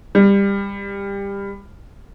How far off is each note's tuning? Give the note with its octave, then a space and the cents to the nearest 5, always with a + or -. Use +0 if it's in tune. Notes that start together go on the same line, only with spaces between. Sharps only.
G3 +25